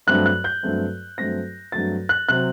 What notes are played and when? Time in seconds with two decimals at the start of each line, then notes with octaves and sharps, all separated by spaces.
0.07 G2 F#3 A3 C4 F#6
0.26 F#6
0.44 G6
0.63 G2 F#3 A3 C4
1.18 G2 F#3 A3 C4 A#6
1.72 G2 F#3 A3 C4 A6
2.09 F#6
2.29 C3 F#3 C4 F#6